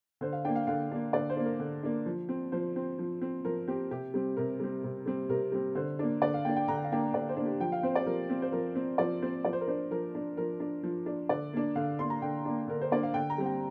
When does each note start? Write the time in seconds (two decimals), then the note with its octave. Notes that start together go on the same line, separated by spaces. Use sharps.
0.21 D3 C5
0.33 F5
0.45 A#3 D4 G5
0.56 F5
0.67 D3 F5
0.91 A#3 D4
1.13 D3 D5
1.30 C5
1.37 A#3 D4
1.45 A#4
1.60 D3
1.83 A#3 D4
2.06 F3
2.29 C4
2.52 F3 C5
2.76 C4
2.99 F3
3.21 C4
3.45 F3 A#4
3.68 C4 G4
3.91 C3 G4
4.14 G3 C4
4.37 C3 A#4
4.60 G3 C4
4.84 C3
5.06 G3 C4
5.29 C3 A#4
5.52 G3 C4
5.75 D3 C5
5.99 A#3 D4
6.21 D3 D5
6.34 F5
6.45 A#3 D4 G5
6.56 G5
6.68 D3 A#5
6.76 G5
6.84 F5
6.92 A#3 D4 G5
7.14 D3 D5
7.29 C5
7.37 A#3 D4
7.45 G4
7.60 F3 G5
7.72 F5
7.83 C4 C5
7.95 D5
8.02 G4
8.06 F3 A#4
8.30 C4
8.42 C5
8.52 F3 A#4
8.75 C4
8.98 F3 D5
9.22 C4 C5
9.45 F3 D5
9.53 C5
9.61 A#4
9.67 D4 C5
9.91 F3 A#4
10.15 D4
10.37 F3 A#4
10.60 D4
10.83 F3
11.06 D4
11.29 D3 D5
11.53 A#3 D4
11.76 D3 F5
11.99 A#3 D4 C6
12.10 A#5
12.22 D3 G5
12.45 A#3 D4
12.68 D3 A#4
12.81 C5
12.91 A#3 D4 D5
13.03 F5
13.14 D3 G5
13.30 A#5
13.38 G3 C4
13.46 G5